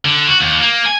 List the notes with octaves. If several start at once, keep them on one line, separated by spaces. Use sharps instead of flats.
D3
F#4
D#2
A#3
G#5